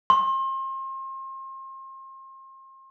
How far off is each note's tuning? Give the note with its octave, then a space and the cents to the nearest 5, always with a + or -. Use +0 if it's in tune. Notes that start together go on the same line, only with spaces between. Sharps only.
C6 +35